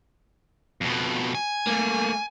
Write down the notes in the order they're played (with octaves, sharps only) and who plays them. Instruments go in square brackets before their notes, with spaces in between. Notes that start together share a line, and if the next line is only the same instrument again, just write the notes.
[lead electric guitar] F2 B2
G#5
[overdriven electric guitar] A3 A#3